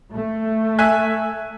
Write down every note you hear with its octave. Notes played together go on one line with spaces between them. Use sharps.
A3
E5 G#5 F#6